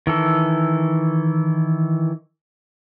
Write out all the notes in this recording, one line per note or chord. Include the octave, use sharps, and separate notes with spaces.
D#3 E3 A4